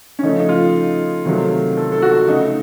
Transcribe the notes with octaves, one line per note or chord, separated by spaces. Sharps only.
C#4
C#3 F3 A3 D#4
D#4
F4
C3 D#3 F#3 A3
A4
A4
F#4
C#3 A3 D#4